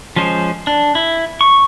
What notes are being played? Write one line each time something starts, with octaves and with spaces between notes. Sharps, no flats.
F3 G#3 C#4 C5
D4
E4
C#6